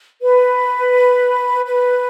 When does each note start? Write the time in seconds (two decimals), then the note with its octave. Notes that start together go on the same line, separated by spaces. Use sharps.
0.20 B4
1.65 B4